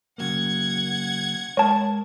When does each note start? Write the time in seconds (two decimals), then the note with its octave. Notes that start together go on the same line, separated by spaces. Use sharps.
0.18 C#3 F#3 A#3 F#5 G#6
1.57 G#3 A#4 C#5 A5